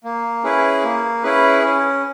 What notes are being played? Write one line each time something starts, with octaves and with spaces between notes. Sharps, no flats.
A#3
C#4 E4 G#4 B4
A#3
C#4 E4 G#4 B4
C#4